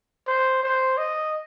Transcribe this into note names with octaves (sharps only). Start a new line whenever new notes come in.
C5
C5
D#5